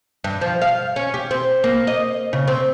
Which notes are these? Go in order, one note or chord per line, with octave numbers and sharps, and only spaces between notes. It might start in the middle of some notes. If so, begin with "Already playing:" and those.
G2
F3
F5
C#4
G4
C4
A#3
D#5
C#3
C4